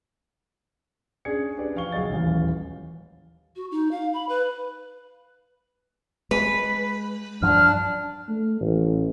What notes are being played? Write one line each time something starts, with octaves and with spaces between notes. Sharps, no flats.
C#4 D4 G#4 D5 G#6 C#7
D4 G4 G#4 B4 D5
F3 F5 C#6 G7
F#1 B1 F#4 G#4 D#5 A6
D#1 A1 E2 F5
F#4
D#4
F5
B5
B4
G#3 B4
G2 F3 F#3 D4 F6
A3
A1